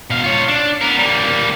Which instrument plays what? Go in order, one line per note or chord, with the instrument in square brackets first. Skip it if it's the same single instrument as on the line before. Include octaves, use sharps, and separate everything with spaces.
[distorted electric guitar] B2 F5
F4 C#5
D4
B3 A#4
G3 A#3